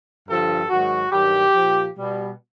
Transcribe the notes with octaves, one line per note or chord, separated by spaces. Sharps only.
G2 D3 F3 A4
G#2 D#3 F#3 F#4
G2 D#3 F#3 G4
A#2 F3
B2 G3